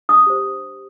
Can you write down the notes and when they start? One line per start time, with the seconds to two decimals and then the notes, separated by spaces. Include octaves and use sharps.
0.09 D4 D#6
0.27 G4 C5